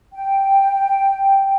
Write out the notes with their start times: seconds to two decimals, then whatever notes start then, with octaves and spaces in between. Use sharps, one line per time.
0.13 G5